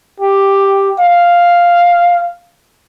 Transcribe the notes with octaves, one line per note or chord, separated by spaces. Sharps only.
G4
F5